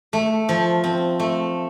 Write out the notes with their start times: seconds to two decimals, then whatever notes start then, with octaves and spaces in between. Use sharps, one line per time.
0.13 A3
0.49 F3
0.84 C4
1.20 A3